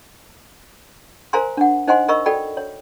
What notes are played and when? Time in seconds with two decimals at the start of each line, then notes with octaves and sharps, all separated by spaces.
1.33 A#4 C5 F5 G#5 A#5 C6
1.57 D4 F#5
1.88 D#4 C5 D#5 F#5 G#5 C6
2.08 A#4 D#5 E5 B5 C#6 E6
2.26 F#4 A4 D5 G5 B5
2.57 C#5